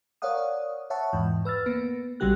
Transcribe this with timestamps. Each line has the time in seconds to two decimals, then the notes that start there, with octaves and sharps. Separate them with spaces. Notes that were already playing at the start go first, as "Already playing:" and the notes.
0.22 A#4 C#5 D5 F5 F#5 D#6
0.90 C#5 E5 F#5 A5 C#6
1.13 E2 G#2 E3
1.45 B4 E6 F6 A6
1.66 A#3 B3 B4
2.20 A#1 C#3 G3 F#4 G4 F#6